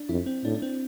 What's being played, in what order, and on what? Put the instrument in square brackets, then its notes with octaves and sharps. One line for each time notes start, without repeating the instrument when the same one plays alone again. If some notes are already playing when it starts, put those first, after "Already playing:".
Already playing: [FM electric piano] D4
[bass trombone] F2 [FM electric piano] E4
[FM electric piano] C4
[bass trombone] A2 [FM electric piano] D4
[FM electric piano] D4
C4